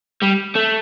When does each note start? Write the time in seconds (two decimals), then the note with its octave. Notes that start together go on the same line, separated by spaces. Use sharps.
0.23 G3
0.56 A3